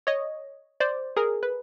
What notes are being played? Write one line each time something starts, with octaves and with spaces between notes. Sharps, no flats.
C#5 D#5
C5 D5
G#4 A#4
B4